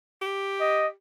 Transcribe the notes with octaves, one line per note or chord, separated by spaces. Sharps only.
G4
D#5